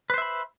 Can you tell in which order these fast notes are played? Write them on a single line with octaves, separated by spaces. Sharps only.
B4 C5 E5 B5